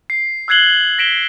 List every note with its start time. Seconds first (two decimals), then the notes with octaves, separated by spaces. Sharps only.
0.10 C7
0.48 E6 F#6 G#6 C7 F#7 G7
0.98 A#6 B6 D7 E7 G7